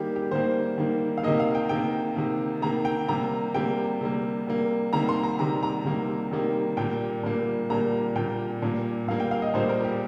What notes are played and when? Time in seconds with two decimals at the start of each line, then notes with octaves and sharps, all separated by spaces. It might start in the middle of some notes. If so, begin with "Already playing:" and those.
Already playing: D#3 G3 A#3 G4
0.16 G4
0.31 D#3 G3 A#3 C5
0.78 D#3 G3 A#3
1.18 F5
1.23 C3 D#3 A#3 D#5
1.40 F5
1.55 G5
1.69 C3 D#3 A#3 G5
2.16 C3 D#3 A#3
2.62 C3 D#3 A#3 A#5
2.85 G5
3.08 C3 G3 A#3 A#5
3.54 C3 G3 A#3 G5
4.01 C3 G3 A#3
4.47 C3 G3 A#3
4.93 C3 D#3 G3 A#3 A#5
5.09 C6
5.23 A#5
5.39 C3 D#3 G3 A#3 A#5
5.63 A#5
5.85 C3 D#3 G3 A#3
6.31 C3 D#3 G3 A#3
6.77 A#2 G3 A#3 G5
7.23 A#2 G3 A#3
7.70 A#2 G3 A#3 A#5
8.16 A#2 G3 A#3 G5
8.62 A#2 G3 A#3
9.07 A#2 G3 A#3 F5
9.20 G5
9.31 F5
9.42 D#5
9.54 A#2 G3 A#3 C5
9.69 A#4
9.84 G4